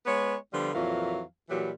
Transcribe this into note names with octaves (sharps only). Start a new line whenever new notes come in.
G#3 B3 B4 C#5
D3 F3 G3 B3 F4
F2 A#2 E3 F#3 F5
A#2 E3 F#3 G3